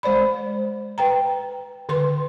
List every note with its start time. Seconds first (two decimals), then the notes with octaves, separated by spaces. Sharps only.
0.03 G#3 C5 D5 B5
0.98 B4 G5 A#5
1.89 D3 B4 C6